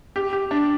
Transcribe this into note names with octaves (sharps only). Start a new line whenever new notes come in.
G4
G4
D4